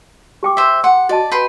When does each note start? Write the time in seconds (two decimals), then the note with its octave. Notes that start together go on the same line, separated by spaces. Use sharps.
0.43 G4 G5 D6
0.57 C5 E5
0.84 F#5 C6
1.09 F#4 D5 D#5 A5
1.32 B4 G5 C6